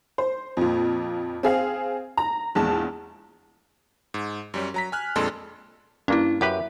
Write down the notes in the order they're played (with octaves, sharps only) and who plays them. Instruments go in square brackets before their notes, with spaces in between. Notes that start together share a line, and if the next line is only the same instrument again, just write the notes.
[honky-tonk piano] C5
F2 A#2
C4 G#4 F5
A#5
A#1 E2 G#3 A5
[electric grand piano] G#2
F#2 G3 C#4
F#3 A#5 B6
G#5 F6 F#6
F2 A#2 G#3 D4 A4 C6
[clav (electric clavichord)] G2 A#3 [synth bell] C#4 E4
[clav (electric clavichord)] F#2 G4 B4 [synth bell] E5